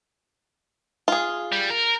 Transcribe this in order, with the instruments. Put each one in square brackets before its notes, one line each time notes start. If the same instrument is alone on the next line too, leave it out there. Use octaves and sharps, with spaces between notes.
[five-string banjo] F4 G#4
[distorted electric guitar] G3
A#4